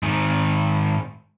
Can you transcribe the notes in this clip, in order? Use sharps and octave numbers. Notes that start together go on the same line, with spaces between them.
G#2 D#3